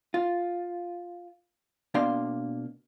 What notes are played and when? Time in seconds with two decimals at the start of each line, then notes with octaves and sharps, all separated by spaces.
0.14 F4
1.94 B2 A#3 D4 F5 G5 C6